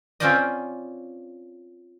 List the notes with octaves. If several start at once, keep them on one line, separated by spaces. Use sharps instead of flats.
C4 C#4 F4 C5 D5 D#5